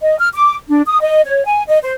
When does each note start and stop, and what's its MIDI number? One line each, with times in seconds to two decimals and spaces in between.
0.01 0.17 75
0.20 0.29 89
0.34 0.55 86
0.69 0.83 62
0.87 1.00 87
1.01 1.22 75
1.25 1.43 73
1.45 1.64 80
1.69 1.78 75
1.83 1.92 72